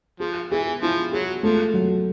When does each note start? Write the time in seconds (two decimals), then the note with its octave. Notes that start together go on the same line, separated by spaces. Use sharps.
0.20 F3 G#4
0.51 E3 G#4
0.82 F3 E4
1.12 F#3 G#4
1.43 F3 A3
1.74 F#3